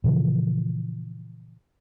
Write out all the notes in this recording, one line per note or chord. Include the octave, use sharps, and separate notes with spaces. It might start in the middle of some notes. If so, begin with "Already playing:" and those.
A#2 C#3 E3 F3